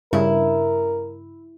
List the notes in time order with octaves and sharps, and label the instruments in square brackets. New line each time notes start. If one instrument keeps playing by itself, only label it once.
[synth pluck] G2 C#3 [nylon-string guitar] E4 [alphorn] A#4